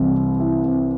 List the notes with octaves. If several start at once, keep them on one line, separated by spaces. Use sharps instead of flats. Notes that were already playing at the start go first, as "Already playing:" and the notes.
Already playing: C2 C3 E3 E4
E4
C4